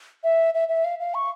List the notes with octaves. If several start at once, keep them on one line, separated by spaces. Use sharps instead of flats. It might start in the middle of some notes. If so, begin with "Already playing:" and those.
E5
E5
E5
F5
F5
C#6